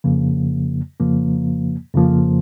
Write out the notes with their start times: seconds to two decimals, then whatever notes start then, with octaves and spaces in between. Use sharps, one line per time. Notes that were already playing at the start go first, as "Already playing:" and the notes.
0.04 F2 C#3 F3 A#3
1.00 F2 C#3 F3 A#3
1.94 F2 C#3 F3 A#3